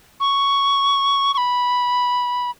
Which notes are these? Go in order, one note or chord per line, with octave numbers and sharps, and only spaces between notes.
C#6
C#6
B5